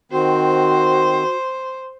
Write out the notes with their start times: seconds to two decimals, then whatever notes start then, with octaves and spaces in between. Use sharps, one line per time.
0.12 D#3 C4 F#4 C5